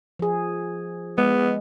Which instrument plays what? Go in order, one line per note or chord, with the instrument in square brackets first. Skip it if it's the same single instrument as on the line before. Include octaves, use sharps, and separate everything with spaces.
[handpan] F3 G#4
[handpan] G#3 [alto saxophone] B3